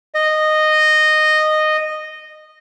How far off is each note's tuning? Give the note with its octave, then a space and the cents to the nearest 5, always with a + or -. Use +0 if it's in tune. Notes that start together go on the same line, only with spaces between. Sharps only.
D#5 -10